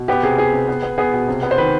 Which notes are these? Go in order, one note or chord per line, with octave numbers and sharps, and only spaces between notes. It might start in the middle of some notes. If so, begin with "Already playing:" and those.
Already playing: B2
B3 G4
C3 G#4
B3 G#4
C3
B3
B3
B3 G#4
B2
C3
B3
C5
D#3 B4